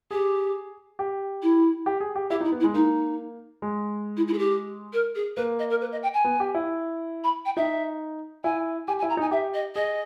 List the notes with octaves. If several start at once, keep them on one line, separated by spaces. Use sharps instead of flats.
G4 G#4
G4
E4
G4
G#4
G4
E4 G4
D#4
E4
B3
E4
G#3
A#3 D#4
G#3
E4
E4
G#4
G4
A#4
G#4
A#3 B4
D#5
A#4
B4
D#5
G5
G#5
B3
G4
E4
B5
G5
D#4 E5
E4 G#5
G4 G#5
G#5
E4
A#5
D#4 G#5
G4 E5
D#5
G#4 D#5